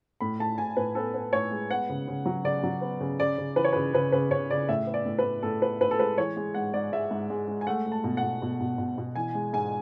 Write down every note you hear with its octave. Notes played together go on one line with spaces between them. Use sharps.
A2 B5
A2 A5
A2 G#5
A2 B4
B3 A4
B3
A2 C#5
G#3
B3 F#5
C#3
C#3
F#3
C#3 D5
F#3
B3
C#3
C#3 D5
C#3
E3 B4
C#5
C#3 B4
C#3 B4
C#3 B4
C#3 C#5
C#3 D5
A2 E5
B3
D5
A2
B4
A2
A2 A4
B3 B4
A2 B4
A4
G#3 B4
E3 C#5
G#3
G#2 F#5
G#2 D5
G#3 E5
G#2
G#3
G#3
G#5
A3 F#5
A3
A5
B2
F#5
B2
B2
B2
B2
B2
E3 G#5
G#3
G#2 G#5